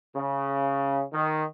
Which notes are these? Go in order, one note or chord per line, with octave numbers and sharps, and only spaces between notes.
C#3
D#3